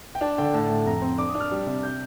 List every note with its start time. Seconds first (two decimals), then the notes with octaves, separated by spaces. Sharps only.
0.15 G5
0.21 D4 A5
0.38 D3 G5
0.54 A2 A5
0.69 A2
0.86 F2 A#5
1.02 C4
1.18 D4 D6
1.29 D#6
1.35 D4
1.41 F6
1.51 G3
1.66 C3
1.83 G6